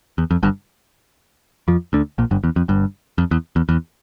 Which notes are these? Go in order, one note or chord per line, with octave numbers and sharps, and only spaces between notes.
E2
F2
G1 G2
F2 F3
D2 D3
A#1 A#2
G1 G2
E2
F2
G1 G2
F2
E2
E2
E2